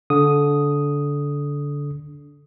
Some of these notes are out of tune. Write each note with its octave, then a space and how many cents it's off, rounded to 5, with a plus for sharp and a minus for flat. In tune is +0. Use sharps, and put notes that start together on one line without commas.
D3 -25 D#6 +0